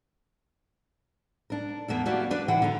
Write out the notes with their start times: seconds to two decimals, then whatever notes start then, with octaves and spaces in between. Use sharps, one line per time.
1.50 D4 A#4
1.88 E2 A#3 B3 A4
2.05 E3 A#3 F#4 G4 D5
2.30 D4 B4 D5
2.48 D#2 E3 F#5 G5
2.62 D3 E3 A#5